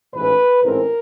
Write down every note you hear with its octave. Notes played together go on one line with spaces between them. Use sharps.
A1 G#2 E3 B4
A1 G#2 E3 A3 C4 A#4